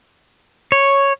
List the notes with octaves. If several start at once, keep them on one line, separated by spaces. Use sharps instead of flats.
C#5